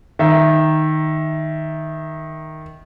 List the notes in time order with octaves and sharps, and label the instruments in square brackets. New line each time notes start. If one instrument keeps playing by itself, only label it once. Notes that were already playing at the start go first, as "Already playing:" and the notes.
[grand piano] D#3 E5